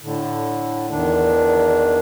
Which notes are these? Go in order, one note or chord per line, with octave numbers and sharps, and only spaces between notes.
A2 D3
E2 D#3 D4